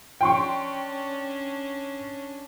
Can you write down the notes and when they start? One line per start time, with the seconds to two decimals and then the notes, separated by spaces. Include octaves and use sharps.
0.21 C#4 D4 G5 C6 C#6